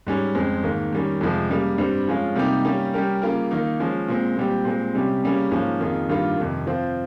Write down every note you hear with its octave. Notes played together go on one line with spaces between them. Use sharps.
G#2 G3 C#4
F2 C#3 G#3 C4
G#2 D#3 A#3
D#3 G3 C#4
F2 C3 F3 G#3
C#3 G3 A#3
G2 G3 C4
F3 G#3 C#4 F4
C3 G3 A#3 D#4 G4
G3 A#3 C#4 G4
G3 C#4 G4 A#4
C#3 G3 A#3 F4 A#4
D#3 A#3 D#4
F3 G#3 C#4
A#2 G#3 C4
A#2 G3 C4 G4
A#2 G#3 C4
C3 G3 C#4 G4
C#3 G3 A#3 C#4
G#2 F3 A#3 C#4
F2 D#3 A#3 F4 G#4
G2 D#3 G3 A#3 F4
F2 C3 D#3
F3 C4 F4